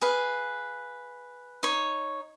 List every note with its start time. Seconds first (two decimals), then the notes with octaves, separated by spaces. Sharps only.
0.01 G#4 B4 F5
1.63 D#4 C#5